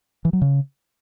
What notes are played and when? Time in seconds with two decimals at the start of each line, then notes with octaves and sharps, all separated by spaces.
0.25 E3
0.33 F#3
0.42 C#3